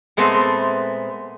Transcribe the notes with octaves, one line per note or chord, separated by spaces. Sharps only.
A#2 G#3 A3 B3 C4